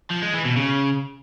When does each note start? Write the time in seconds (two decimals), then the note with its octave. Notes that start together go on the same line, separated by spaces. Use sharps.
0.11 F3
0.22 G#3
0.34 E3
0.45 B2
0.57 C#3